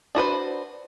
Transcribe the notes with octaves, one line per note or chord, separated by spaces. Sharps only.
D4 F#4 B4 C5